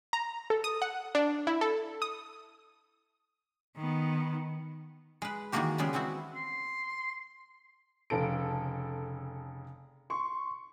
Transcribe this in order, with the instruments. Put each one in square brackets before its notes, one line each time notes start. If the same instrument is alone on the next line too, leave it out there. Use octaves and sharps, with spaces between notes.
[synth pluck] A#5
A4
D#6
F#5
D4
E4
A4
D#6
[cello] D#3 B3
[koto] G#3 B4
D#3 E3 G#3 A#3 F#4 G4
C#3 G3 G#3 B3
G#3 B3 C4 E4 F#4
[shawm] C6
[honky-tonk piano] F1 C#3 A4 D7
C6 C#6